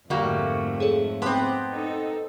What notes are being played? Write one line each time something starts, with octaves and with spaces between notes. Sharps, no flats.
F2 G#2 D3 G3 A3 A#3 F#4
G#4 A4 C#5
B3 C4 A5 C6 D6
D#4 A4